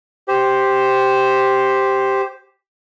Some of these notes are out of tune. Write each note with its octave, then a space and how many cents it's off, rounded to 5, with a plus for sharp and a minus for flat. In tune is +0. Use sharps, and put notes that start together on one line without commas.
G4 +0 C5 +0